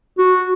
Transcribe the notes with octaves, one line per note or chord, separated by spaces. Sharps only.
F#4